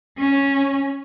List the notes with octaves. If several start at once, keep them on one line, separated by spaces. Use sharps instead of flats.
C#4